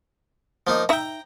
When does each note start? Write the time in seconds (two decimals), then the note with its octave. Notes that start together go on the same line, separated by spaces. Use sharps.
0.67 F3 A#3 D#4
0.89 D#4 E5 G5 A#5